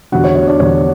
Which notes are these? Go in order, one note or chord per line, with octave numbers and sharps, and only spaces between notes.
E2 D3 G3 F#4 F#5
C#5
C#5
D4 D5
E2 D3 G3 C#5